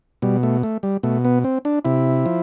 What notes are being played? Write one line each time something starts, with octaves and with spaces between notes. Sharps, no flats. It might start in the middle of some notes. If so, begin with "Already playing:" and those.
B2 G3
A3
A3
G3
B2 A3
B3
C4
D4
C3 E4
F3